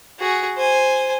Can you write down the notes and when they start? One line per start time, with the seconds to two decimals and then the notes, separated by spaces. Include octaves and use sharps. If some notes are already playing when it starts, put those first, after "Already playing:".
0.19 F#4 G#4
0.57 C5 G#5